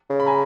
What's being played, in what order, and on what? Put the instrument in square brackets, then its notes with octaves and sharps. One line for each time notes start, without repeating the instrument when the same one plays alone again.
[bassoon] C#3
[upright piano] B5
G#5 A#5